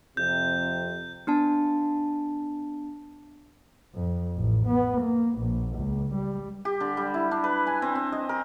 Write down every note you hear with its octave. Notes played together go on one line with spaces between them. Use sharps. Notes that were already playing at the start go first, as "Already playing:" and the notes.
F2 C3 G6
B3 D4 A5
F2
A1
B3
A#3
A#1
C#2
G3
G4
D3
G3
E4
D4
B4
G#5
C4
C4
D#5
A#4